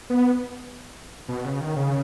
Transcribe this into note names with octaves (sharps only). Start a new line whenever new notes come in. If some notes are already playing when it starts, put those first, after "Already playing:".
B3
B2
C#3
D#3
C#3